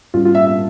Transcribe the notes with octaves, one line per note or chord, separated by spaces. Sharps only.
G#2 G3 C#4 F4
F4
E5
E5